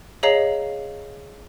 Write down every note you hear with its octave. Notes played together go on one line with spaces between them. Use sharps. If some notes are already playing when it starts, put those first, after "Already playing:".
G#4 C#5 D#5 F5 A#5 C7